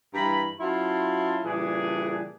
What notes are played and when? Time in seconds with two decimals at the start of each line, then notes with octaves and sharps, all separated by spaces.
0.14 G2 E3 A#5 B5
0.60 F#3 C#4 E4 F4 A5 C6
1.45 A#2 C#3 E3 G3 D4 G#4